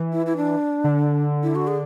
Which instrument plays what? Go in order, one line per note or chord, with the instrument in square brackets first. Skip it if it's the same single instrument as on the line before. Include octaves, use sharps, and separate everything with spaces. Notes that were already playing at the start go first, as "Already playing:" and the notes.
Already playing: [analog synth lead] E3
[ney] E4
E4
D4
[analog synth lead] D3
[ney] E4
F#4
G#4